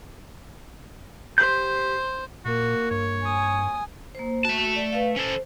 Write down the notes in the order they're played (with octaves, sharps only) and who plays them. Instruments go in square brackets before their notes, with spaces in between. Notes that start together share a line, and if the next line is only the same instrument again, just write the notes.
[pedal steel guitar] G4 G6 [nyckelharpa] C5
[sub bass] A#2 [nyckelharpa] A#3 [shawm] F#4
[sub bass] G2 [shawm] C#5
[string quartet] G#5 [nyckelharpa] D#6
[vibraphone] A#3 C5
[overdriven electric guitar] A3 A5 [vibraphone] F#4
[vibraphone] D5
B4 F5
[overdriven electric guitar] C#4 A4 [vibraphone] C5